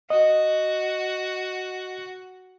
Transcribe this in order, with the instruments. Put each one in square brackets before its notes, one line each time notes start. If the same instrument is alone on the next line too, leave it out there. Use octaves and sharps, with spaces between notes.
[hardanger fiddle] F#4 [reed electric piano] D#5